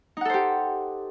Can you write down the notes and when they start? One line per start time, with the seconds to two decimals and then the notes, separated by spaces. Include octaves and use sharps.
0.17 D#4
0.21 F#5
0.25 A4
0.30 C5
0.34 G4